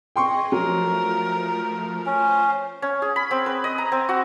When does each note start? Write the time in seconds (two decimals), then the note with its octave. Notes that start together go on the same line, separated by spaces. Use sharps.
0.16 G#4 D#5 G5 C6 C#6
0.52 F3 F#3 A3 A#4
2.06 C#4 F4 C5
2.82 C#4
3.02 G#4
3.16 B5
3.31 C4
3.46 B4
3.64 D#5
3.78 A#5
3.92 C4
4.09 F#4